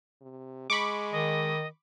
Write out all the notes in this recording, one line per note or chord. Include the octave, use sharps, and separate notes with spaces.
C3
G#3 B5 C#6 D6
D#3 D#5